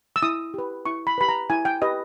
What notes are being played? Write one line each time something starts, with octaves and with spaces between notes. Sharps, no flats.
E6
E4 D#6
G4 B4
E4 C#6
B5
G4 B4 B5
A#5
E4 G#5
G5
G4 B4 D#5